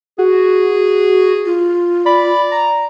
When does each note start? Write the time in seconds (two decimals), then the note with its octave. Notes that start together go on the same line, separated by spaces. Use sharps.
0.18 F#4 G#4
1.45 F4
2.06 D5 B5
2.51 A#5